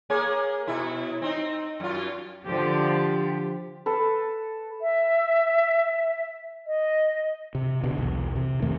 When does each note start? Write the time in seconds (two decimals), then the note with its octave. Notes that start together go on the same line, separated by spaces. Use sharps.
0.10 A#3 G#4 C#5
0.67 B2 E4
1.22 C4 D#4
1.80 F#2 F4
2.45 D3 F3 G4
3.86 A4 B4
4.82 E5
6.67 D#5
7.55 C3
7.83 B2 D3
7.98 B1 E2
8.36 C3
8.62 F2 D#3 A3